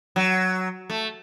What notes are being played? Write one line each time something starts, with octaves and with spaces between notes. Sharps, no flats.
F#3
A3